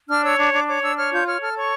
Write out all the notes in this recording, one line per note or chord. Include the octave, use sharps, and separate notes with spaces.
D4 F6
C#5 E6
D4 D6
D4 D6
C#5 D6
D4 E6
C#5 F6
F4 G6
C#5 F6
A4 F6
C#5 C#6